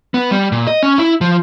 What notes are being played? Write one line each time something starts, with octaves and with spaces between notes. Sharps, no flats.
B3
G3
A#2
D#5
C#4
E4
F3